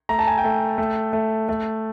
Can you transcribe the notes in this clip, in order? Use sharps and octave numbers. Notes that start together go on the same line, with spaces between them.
A3 A#5
A5
G#5
G5 A5
A3
A3
A3
A3